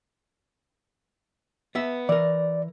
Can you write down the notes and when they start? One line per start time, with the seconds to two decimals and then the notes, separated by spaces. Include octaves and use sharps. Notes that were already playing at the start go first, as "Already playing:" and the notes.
1.75 B3 E5
2.09 E3 A#4 D5